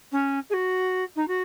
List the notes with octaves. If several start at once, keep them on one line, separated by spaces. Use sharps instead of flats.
C#4
G#4
F#4
D#4
F#4